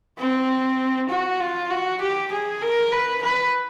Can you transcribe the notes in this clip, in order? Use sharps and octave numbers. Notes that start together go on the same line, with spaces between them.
C4
F#4
F4
F#4
G4
G#4
A#4
B4
B4